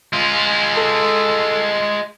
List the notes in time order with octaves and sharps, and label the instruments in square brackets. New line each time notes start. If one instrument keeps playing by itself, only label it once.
[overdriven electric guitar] G#3 F4
[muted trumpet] A4